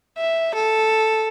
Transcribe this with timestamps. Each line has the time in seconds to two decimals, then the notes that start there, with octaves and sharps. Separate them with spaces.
0.18 E5
0.55 A4